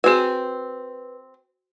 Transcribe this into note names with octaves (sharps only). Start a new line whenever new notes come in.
C4 F#4 G#4 B4 G#5